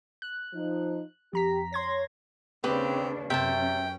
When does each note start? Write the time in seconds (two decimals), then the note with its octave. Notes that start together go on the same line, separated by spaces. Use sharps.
0.22 F#6
0.54 F3 D#4 C5
1.33 F2 G4 A#5 B6
1.73 C#5 C6 G#6 A#6
2.64 D#2 C#3 C4 D4 G4 B4
3.30 F#2 C3 C#4 E5 G5 A5